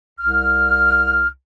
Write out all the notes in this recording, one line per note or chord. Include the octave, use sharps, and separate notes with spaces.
C2 F6